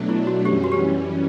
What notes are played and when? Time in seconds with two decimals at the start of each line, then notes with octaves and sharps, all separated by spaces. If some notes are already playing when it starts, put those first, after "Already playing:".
Already playing: B2 F#3 A3 D4
0.09 E4
0.27 F#4
0.45 F#2 E3 G3 C#4 G4
0.64 F#4
0.72 G4